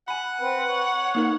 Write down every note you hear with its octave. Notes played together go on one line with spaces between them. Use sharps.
F#5 G#5 B5
C4 B4
C#5
A#3 D#4 A#4